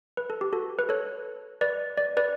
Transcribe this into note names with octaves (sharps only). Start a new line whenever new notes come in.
B4
A4
G4
F#4 A4
B4
A4 C#5
B4 D5
D5
B4 D5